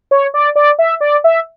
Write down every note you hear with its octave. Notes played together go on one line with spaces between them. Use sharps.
C#5
D5
D5
E5
D5
E5